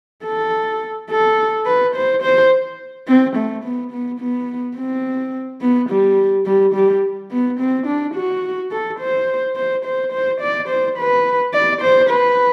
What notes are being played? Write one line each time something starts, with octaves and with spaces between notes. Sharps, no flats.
A4
A4
B4
C5
C5
C4
A3
B3
B3
B3
C4
B3
G3
G3
G3
B3
C4
D4
F#4
A4
C5
C5
C5
C5
D5
C5
B4
D5
C5
B4